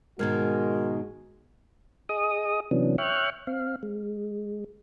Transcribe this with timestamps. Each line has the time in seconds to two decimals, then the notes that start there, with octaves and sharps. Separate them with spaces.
0.19 G#2 B2 D#3 G#3 F#4 A#4 F6 G#6
2.09 G#4 D#5 D#6
2.71 C3 E3 F#3 B3 C#4 D4
2.98 C#5 E5 G5 C#6 F6 F#6
3.47 C4 F5
3.83 G#3